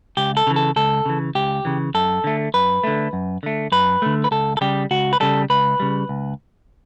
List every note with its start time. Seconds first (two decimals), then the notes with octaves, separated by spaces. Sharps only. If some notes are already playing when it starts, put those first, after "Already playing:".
0.17 C#2 G4
0.37 A4
0.47 C#3 E3
0.56 A4
0.76 C#2 A4
1.06 C#3 E3
1.35 C#2 G4
1.65 C#3 E3
1.94 F#2 A4
2.24 D3 A3
2.54 F#2 B4
2.84 D3 A3
3.13 F#2
3.43 D3 A3
3.72 F#2 B4
4.02 D3 A3
4.24 B4
4.31 C#2 A4
4.57 A4
4.61 C#3 G3 G4
4.91 C#2 F#4
5.13 B4
5.20 C#3 G3 A4
5.50 C#2 B4
5.80 C#3 G3
6.09 C#2